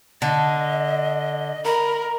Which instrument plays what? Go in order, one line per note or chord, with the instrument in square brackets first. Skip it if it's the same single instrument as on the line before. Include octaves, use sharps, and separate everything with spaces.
[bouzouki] D3 [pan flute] D#5
[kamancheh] A#4 [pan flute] B5